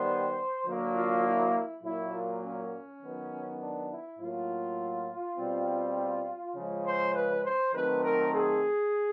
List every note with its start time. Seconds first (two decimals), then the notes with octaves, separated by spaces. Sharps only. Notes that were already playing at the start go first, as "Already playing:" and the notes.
Already playing: D#3 G3 B3 C5
0.66 D3 F#3 A#3
0.95 F4
1.24 E4
1.83 A#2 F#3 A#3 E4
2.13 F4
2.43 C#4
3.02 D#3 F#3 B3
3.61 D4
3.89 E4
4.19 A2 F#3 A#3 F4
5.37 B2 G3 C4
6.56 C#3 F3 G#3
6.84 C5
7.14 B4
7.44 C5
7.73 D#3 F#3 A3 C4 B4
8.03 A#4
8.32 G#4